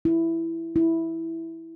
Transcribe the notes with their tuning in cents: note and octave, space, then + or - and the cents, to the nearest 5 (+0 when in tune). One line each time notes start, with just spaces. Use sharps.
E4 +5
E4 -5